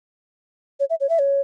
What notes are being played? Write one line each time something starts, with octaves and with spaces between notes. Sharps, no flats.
C#5
E5
C#5
E5
C#5